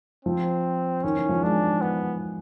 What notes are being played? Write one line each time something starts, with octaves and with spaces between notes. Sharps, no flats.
F3 C4
D#3 C#4
E3
F3
G#3 D4
B3